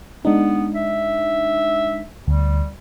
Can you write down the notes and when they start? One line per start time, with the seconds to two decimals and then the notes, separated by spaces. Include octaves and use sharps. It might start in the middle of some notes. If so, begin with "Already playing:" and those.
0.25 G#3 B3 D4 D#4
0.75 E5
2.27 D2 G3